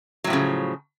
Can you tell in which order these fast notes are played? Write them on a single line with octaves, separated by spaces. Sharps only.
F#3 A2 F3 C#3